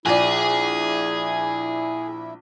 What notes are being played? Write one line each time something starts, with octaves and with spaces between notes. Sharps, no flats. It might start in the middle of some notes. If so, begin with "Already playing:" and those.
A#1 E4 G#4 D5